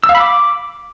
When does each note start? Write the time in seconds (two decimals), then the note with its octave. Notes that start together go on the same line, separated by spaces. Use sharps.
0.04 E6
0.09 F5
0.15 B5
0.20 D6